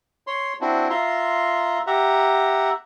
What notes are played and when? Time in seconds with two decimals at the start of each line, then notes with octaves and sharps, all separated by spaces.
0.27 C#5 C6
0.61 C4 D4 E4 F#4
0.90 F4 E5 A#5 C6
1.87 G4 E5 F#5 A#5